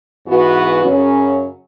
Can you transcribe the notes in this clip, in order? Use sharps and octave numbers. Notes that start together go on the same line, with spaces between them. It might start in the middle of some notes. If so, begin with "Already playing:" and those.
G#2 E3 B3 F#4 B4
F#2 C#3 F#3 C#4